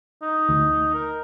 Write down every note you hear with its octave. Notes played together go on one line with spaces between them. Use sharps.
D#4
D2
A#4